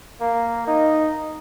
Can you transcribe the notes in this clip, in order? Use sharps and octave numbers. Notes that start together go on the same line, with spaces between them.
A#3
D#4